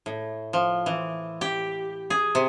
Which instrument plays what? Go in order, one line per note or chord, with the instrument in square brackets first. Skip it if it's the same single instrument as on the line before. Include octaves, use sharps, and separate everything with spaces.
[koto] A2
F3
E3
G4
G#4
C3